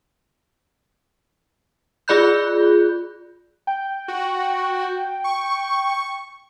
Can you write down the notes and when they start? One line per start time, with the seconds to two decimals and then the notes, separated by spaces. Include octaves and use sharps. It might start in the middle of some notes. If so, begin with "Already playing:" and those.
2.08 F4 G#4 D5 B5 F#6 G6
3.67 G5
4.08 F#4
5.24 C#6